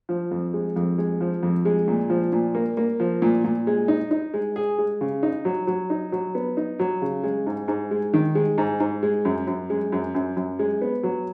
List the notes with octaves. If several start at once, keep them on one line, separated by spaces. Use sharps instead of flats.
F3
F2
G#3
F2
G#3
F3
F2
G#3
A#2
F3
A#2
A#3
A#3
F3
A#2
A#2
G#3
D#4
D#4
G#3
G#4
G#3
C#3
D#4
F#3
F#3
D#4
F#3
B3
D#4
F#3
C#3
G#3
G#2
G#2
G#3
D#3
G#3
G#2
G#2
G#3
F#2
F#2
G#3
F#2
F#2
F#2
G#3
B3
F#3